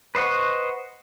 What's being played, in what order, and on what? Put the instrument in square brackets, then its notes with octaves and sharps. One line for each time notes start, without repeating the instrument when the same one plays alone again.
[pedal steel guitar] B4 C5 D#5 F#5 C#6